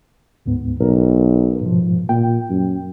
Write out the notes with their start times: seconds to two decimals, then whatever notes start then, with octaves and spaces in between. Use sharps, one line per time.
0.46 D2 G#2 B3
0.80 B1 A#4
1.61 G#2 B2 F3
2.09 A#2 G5
2.50 F#2